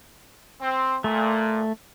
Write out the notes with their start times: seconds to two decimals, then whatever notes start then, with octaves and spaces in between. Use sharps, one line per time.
0.61 C4
1.04 A#2 A3